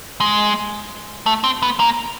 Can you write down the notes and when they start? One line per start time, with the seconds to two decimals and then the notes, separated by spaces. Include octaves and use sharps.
0.20 G#3
1.26 A3
1.44 C4
1.62 B3
1.80 A#3